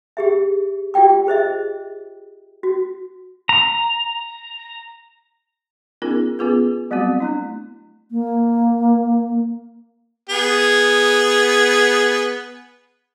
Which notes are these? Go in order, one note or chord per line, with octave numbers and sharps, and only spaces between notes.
G4 G#4 E5
F4 G4 D5 G5 D6
G#4 C5 D#5 E5
F#4
A#5
B3 C#4 D#4 F4 G#4 A#4
B3 C#4 F4 G#4 A4 B4
F#3 G3 A3 B3 C4 F#4
A3 D4 E4
A#3
B3 G#4